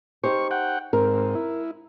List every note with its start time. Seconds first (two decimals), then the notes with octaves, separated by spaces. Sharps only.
0.24 D#4 G4 C5 C#6
0.51 F#5 G5
0.93 G#2 C4 A#4
1.35 E4